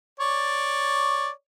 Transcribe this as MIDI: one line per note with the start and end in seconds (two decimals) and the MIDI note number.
0.20 1.30 73
0.20 1.30 74